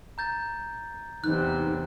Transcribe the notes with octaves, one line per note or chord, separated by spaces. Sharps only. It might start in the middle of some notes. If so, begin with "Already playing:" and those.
A#5 G6 A6
E2 C3 D#4 F#6